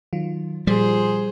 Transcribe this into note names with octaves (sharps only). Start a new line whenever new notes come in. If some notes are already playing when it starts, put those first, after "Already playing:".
D#3 F#3 F4
A#2 F3 G3 G#4 C5